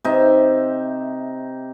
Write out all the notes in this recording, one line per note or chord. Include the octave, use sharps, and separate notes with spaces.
C3 D#4 E5